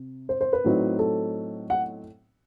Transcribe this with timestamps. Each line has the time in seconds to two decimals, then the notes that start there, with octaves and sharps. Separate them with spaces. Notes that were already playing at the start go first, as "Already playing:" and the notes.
Already playing: C3
0.29 C5
0.41 C5
0.53 B4
0.65 A2 F#3 C4 D#4
0.99 A4
1.70 F#5